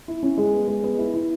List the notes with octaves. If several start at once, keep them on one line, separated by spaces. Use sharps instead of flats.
E4
C#4
G#3
B3
G#3
B3
E4
E4